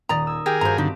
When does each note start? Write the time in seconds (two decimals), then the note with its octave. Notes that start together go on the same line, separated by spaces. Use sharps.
0.09 D#1 D5 A#5 D#6 A#6
0.26 D#6 E6 G#6
0.46 G4 G#4 A#4
0.61 G2 F#4 C5 A#5 B5
0.78 D3 A3 C4 D#4 G4